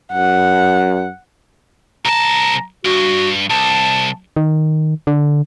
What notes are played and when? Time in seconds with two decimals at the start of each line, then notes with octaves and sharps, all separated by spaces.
0.12 F#2 F#5
2.05 C2 A5 A#5
2.85 G2 F#4
3.50 C2 A5
4.36 D#3
5.07 D3